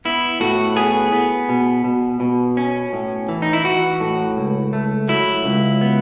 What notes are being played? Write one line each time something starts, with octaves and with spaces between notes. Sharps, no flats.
B3 E4
A2 F#4
B3 G#4
B3
B2
B2
B2
C#4
A2
E3
D#4
E4
E3 F#4
A2
C#2
A3
F#3 E4
C#2
B3